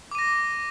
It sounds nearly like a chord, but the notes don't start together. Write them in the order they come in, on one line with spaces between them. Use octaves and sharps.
D6 D#7 A#6